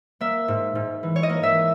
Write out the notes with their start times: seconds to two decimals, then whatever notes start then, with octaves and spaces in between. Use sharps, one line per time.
0.21 A#3 E5
0.48 G#2
0.75 G#2
1.03 E3
1.16 C#5
1.23 D#5
1.30 A#3
1.43 E5